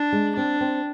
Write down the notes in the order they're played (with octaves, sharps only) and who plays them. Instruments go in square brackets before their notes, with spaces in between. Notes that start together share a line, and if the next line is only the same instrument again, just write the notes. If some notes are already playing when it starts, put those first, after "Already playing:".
Already playing: [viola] D4
[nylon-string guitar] G#3
[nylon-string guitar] C4 [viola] D4
[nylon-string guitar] C4